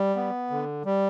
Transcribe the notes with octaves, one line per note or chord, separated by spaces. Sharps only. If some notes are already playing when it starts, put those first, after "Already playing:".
Already playing: G3
B3
D3
G3